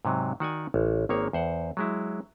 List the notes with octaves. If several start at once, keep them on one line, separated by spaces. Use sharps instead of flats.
G#2 C3 F#3
D#3 F#4 D5 G#5
A1
G#1 D#3 A#3 C#5
E2 C5 F#5
F#3 G#3 E4